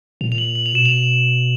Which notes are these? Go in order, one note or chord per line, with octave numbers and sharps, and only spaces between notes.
A#2 F7
F7
F#7
F#7
F7
B2 E7
F7